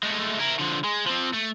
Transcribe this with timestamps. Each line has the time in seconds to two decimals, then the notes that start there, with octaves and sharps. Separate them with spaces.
0.03 G#3 A3
0.40 E4 A#4
0.59 D3 F3
0.84 G#3
1.06 F3 C4
1.33 A3